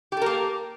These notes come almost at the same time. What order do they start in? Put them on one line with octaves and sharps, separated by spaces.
G4 A4 A#4 A#3